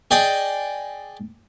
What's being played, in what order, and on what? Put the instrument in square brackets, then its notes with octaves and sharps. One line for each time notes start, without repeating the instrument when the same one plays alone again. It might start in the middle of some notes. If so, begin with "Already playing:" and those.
[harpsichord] G#4 D5 D#5 G5